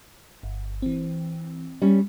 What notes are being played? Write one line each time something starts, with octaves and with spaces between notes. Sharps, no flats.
G1
E3 C4
G3 C#4